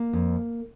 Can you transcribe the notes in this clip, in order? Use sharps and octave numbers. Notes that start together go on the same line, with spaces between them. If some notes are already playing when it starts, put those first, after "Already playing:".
Already playing: A#3
F2